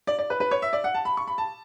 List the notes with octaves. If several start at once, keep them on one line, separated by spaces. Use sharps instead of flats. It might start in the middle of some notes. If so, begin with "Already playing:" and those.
D5
D5
B4
B4
C#5
E5
D5
F#5
A5
B5
C#6
B5
A5